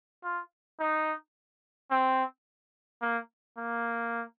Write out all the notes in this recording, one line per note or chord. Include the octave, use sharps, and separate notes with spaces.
F4
D#4
C4
A#3
A#3